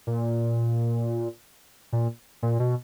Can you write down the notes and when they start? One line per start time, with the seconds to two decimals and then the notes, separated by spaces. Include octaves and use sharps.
0.07 A#2
1.93 A#2
2.43 A#2
2.60 B2